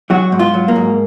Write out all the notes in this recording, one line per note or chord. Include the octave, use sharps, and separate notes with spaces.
F#3 F#4
G#2
F4
F#3
A#3
G#2